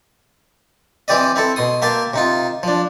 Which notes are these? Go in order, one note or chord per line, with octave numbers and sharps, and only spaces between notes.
E3 C4 G4 D5 D#5
C4 E4 A4
B2 C6 D#6
A#3 E5 G5 A5 C6
C3 D#4 F4
F3 D4